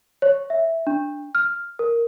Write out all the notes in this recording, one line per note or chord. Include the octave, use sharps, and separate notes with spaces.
C#5
E5
D4
F6
A#4